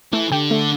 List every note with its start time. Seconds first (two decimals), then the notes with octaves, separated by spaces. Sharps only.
0.13 E3 A3
0.32 D3 G4
0.51 A3